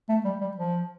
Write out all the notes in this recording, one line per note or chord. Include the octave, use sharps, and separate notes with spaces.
A3
G3
G3
F3